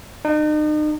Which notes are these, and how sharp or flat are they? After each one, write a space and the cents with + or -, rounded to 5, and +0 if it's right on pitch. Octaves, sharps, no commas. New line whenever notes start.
D#4 -40